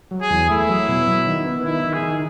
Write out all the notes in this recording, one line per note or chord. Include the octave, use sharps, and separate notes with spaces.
F#3
G#4
E2
A3 E4
F#3
B2
F#3
D#3
B3
D#3 E4
D#3
G#4
D#3